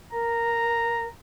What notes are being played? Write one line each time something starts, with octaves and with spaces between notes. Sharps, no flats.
A#4 A#5